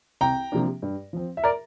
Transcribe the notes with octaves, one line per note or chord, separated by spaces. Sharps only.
C2 G5 A#5
C3 F3 A#3 D4
G2
F3 C4
E5
A#4 D5